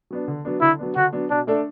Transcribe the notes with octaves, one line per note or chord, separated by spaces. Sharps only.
F#3 B3 D4
D3
F#3 B3 D4
D3 E4
F#3 B3 D4
D3 F#4
F#3 B3 D4
B2 D4
A3 D4 A4 D5